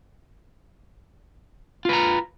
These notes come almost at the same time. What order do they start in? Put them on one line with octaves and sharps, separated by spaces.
F4 B4 A#5